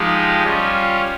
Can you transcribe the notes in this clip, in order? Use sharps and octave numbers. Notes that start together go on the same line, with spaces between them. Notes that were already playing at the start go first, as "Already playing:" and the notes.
Already playing: F3 G#3 D#4 G4
G3 C#4 F4